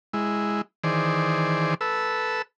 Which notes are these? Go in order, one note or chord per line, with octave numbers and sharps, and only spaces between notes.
G#3 E4
D#3 E3 G#4 C5 D5
A4 B4 E6